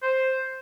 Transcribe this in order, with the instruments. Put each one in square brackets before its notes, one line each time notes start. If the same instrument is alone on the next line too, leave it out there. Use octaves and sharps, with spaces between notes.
[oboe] C5